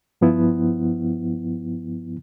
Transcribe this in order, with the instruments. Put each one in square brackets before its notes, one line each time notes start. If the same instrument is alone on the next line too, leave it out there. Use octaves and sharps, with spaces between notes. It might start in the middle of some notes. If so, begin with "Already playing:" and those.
[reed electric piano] G2 F3 B3 E4